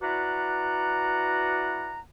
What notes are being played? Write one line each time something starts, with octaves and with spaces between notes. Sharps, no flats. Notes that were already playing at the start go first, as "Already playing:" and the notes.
E4 F#4 B4 D5 F#5 A#5